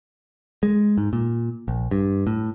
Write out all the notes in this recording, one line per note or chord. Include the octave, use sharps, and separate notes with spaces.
G#3
G#2
A#2
A#1
G2
A2